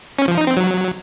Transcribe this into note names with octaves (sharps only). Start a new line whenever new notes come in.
C#4
F3
D#4
C4
F#3